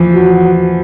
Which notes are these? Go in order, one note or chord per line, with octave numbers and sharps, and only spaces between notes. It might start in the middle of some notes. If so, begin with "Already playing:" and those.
Already playing: E3 F3
F#4